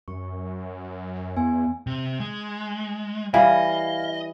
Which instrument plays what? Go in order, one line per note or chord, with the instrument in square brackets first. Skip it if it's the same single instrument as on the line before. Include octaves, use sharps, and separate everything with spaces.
[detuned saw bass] F#2 [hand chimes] C#6
[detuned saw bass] E2 [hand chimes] B3 G#5
[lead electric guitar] C3
G#3
[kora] E3 G3 [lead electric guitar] D#5 [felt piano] F5